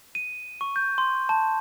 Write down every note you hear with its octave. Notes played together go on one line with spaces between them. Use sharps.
D#7
C#6
G6
C6
A5